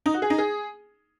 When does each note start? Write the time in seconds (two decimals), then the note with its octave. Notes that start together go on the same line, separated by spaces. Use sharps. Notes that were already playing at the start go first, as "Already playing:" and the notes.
0.06 D#4
0.14 F#4
0.22 G#4
0.30 D#4
0.38 G#4